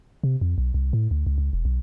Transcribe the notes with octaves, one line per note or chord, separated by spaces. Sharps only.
C3
F2
B1
C2
A2
D2
C#2
C#2
E1
B1